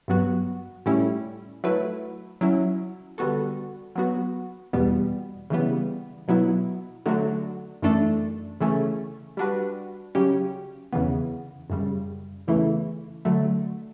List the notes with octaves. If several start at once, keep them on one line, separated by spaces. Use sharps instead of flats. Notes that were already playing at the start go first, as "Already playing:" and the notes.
G2 F#3 B3 F#4
A2 G3 C#4 E4
F#3 A3 E4 B4
F#3 C#4 E4
D3 G3 B3 F#4 A4
F#3 B3 F#4
E2 B2 G3 B3
C#3 E3 G3 B3
B2 F#3 B3 E4
D3 F#3 A3 D4 F#4
F#2 E3 A3 D4 A4
C#3 E3 A3 C#4
G3 D4 F#4 B4
C#3 F#3 C#4 G4
E2 C#3 E3 B3
F#2 C#3 G3
E2 C#3 E3 A3 E4
D3 F#3 A3